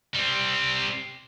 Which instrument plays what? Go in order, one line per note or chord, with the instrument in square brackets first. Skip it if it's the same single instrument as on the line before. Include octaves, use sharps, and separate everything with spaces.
[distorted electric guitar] G3 C4